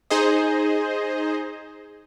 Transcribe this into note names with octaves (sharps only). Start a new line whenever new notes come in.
D#4 G#4 C5 D#5